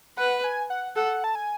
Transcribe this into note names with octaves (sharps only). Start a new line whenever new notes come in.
B4 F#5
G#5
F#5
A4 F#5
A5
G#5